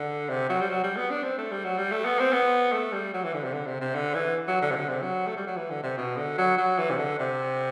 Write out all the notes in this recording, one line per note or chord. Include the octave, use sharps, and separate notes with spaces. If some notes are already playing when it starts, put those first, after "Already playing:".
Already playing: D3
C3
F#3
G3
F#3
G3
B3
D4
C4
A3
G3
F#3
G3
A3
B3
C4
B3
A3
G3
F#3
E3
D3
C3
D3
C3
C3
D3
E3
F#3
D3
C3
D3
C3
F#3
A3
G3
F#3
E3
D3
C3
B2
D3
F#3
F#3
E3
C3
D3
C3